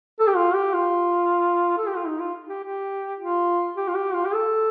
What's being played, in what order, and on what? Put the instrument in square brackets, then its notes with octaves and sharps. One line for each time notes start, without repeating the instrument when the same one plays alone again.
[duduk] A4
G4
F4
G4
F4
A4
G4
F4
D#4
F4
G4
G4
F4
G4
F4
G4
F4
G4
A4